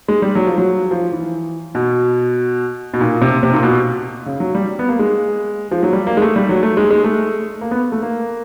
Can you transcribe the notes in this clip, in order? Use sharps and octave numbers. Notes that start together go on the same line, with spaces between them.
G#3
G3
F#3
F3
F#3
F3
E3
B2
B2
A#2
C3
C3
A#2
B2
C#3
F#3
G3
B3
A#3
G#3
F3
F#3
G3
A#3
G#3
A3
G3
F#3
A3
G#3
G#3
A3
A#3
B3
A3
A#3